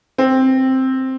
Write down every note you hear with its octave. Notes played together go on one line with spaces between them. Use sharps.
C4